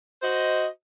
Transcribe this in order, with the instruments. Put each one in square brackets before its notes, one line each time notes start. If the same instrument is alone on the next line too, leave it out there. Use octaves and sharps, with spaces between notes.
[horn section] F#4 C5 D#5